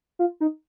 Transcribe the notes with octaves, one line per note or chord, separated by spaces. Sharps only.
F4
D#4